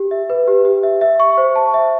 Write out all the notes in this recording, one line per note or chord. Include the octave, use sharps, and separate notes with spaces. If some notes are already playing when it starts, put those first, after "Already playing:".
Already playing: G4
E5
B4
G4
G4
E5
E5
C#6
C5
A5
E5